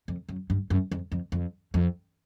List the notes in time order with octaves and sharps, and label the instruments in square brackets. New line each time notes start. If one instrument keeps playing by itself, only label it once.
[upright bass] F2
F#2
G2
F#2
F2
F2
F2
F2